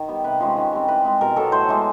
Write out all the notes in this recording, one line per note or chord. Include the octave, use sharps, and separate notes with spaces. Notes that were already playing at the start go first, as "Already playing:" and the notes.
Already playing: D#3
G3 B3
C3 B4
F3 G#3 C#4
D#3
G3 C4
E3 B4
G#3 C4
B2 A#4
F#3 B3 A4
A2 C5
E3 G#3 B3